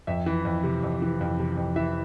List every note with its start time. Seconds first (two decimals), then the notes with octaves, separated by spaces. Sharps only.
0.07 F2 E5
0.26 E3
0.45 F2
0.63 C3
0.83 F2
1.02 E3
1.21 F2
1.39 C3
1.57 F2
1.76 E3 E5